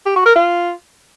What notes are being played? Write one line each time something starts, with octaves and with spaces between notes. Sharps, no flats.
G4
F#4
A#4
F4